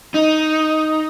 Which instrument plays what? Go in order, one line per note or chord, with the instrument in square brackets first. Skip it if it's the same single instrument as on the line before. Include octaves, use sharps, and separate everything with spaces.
[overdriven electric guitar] D#4